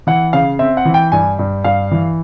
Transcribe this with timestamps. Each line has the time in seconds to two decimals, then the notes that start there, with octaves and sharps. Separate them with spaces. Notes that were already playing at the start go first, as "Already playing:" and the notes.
0.07 E3 F#5
0.33 C#3 F5
0.59 C4 E5
0.77 F#5
0.85 E3
0.94 G5
1.12 G2 G#5
1.39 G2
1.64 G2 F5
1.91 E3